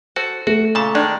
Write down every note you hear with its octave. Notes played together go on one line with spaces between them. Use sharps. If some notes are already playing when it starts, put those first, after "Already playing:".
F#4 A4 C5
A3 F#4
A#2 C#3 A5
D#3 G#3 D4